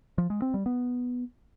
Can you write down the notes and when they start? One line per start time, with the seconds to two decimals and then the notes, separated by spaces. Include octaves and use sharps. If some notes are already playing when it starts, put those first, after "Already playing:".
0.18 F3
0.30 G#3
0.42 C4
0.54 G3
0.66 B3